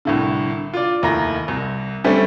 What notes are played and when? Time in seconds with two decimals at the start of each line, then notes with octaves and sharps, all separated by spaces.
0.05 C2 A2 D3
0.74 F4 D5
1.02 F1 D#2 E4 A#5 A#6
1.48 C2
2.04 D3 G3 A3 C4 C#4